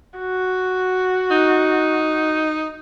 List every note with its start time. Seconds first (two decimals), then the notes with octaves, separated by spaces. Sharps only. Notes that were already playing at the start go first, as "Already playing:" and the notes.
0.19 F#4
1.31 D#4